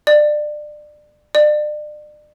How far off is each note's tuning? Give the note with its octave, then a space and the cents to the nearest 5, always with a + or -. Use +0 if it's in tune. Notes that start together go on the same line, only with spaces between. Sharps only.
D5 +25
D5 +35